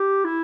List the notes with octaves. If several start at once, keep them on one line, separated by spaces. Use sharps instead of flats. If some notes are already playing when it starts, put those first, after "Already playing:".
Already playing: G4
E4